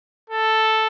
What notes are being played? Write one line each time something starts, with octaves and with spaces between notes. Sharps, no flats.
A4